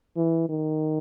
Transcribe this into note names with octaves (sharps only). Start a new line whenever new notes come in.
E3
D#3